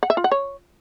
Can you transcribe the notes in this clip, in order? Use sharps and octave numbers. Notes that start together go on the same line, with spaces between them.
F#5
E5
F4
F#5
C#5